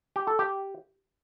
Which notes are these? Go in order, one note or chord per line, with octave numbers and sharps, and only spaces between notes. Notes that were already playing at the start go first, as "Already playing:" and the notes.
G4
A4
G4